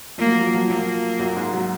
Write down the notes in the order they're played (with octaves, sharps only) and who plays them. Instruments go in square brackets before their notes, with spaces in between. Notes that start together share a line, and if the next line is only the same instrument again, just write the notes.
[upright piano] F3 [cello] A#3
[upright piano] F#3
F3
F#3
F3
F#3
F3
[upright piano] F#3 [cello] A#3
[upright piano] F3
F#2 F#3
G#2 G#3
F#3